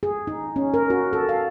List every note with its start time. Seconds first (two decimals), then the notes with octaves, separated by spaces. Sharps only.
0.03 G#4
0.27 D#4
0.56 C#4
0.74 A#4
0.90 F#4
1.13 A4
1.29 F5